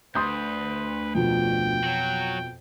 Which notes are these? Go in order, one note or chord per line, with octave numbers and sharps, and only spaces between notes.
D2 B4 C6 D#6 G6
F2 B2 F3 G5
F#3 F#4